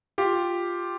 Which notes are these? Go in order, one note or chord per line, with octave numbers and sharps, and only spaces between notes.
F4 G4